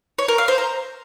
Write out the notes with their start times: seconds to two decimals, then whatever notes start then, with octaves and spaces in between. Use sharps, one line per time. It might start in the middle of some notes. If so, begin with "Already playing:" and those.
0.19 C#5
0.28 A#4
0.38 F5
0.48 C5
0.58 A#5